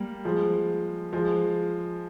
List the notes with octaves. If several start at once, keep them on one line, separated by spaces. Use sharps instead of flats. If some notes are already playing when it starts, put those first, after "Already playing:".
Already playing: G3 A#3
F3 G#3
F3 G#3